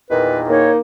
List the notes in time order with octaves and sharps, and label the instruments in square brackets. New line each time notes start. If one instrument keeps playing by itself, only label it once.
[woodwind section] E2 A#2 D#3 [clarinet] B4
[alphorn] A#3 [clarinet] D#4 [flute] C#5